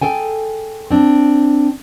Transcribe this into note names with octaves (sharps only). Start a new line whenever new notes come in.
G#4 A4 G5 G#5
C4 D4